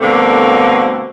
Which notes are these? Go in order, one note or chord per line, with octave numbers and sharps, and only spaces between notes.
G2 B2 D3 A3 A#3 C4